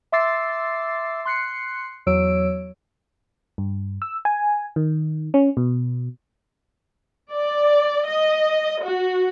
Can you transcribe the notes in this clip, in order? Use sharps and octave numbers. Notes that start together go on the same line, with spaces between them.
E5 C6 D6 E6 A6 C7
C6 F#6 C7 C#7
E2 F#3 C#5 E6 D7
G2
E6
G#5
D#3
C#4
B2
D5
D#5
F#4